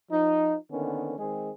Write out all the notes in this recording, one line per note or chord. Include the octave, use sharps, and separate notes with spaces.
F3 D#4
D3 D#3 A#3 B3 C#4
D#3 G#3 C4 G#4